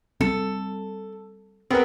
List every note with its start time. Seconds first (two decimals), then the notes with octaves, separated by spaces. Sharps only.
0.21 G3 A3 C4 A4
1.70 B3 C4 G#4 A#4 B4